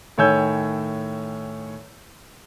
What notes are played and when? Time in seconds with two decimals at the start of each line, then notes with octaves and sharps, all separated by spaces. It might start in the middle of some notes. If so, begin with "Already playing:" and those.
0.18 A2 D#3 C#5 G#5 E6 G6